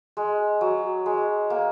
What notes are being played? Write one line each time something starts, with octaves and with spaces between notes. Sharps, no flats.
G#3
F#3
G#3
A#3